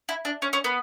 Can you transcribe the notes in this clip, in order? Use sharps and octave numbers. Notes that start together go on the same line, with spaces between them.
E4
D4
C#4
C#4
B3